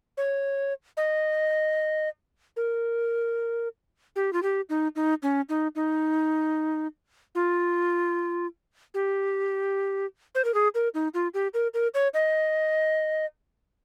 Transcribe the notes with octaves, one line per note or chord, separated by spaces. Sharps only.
C#5
D#5
A#4
G4
F4
G4
D#4
D#4
C#4
D#4
D#4
F4
G4
C5
A#4
G#4
A#4
D#4
F4
G4
A#4
A#4
C#5
D#5